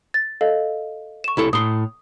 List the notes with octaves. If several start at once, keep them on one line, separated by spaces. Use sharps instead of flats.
A6
A4 D#5 F5
C#6 E7
C2 E4 A4
A2 C6 D#6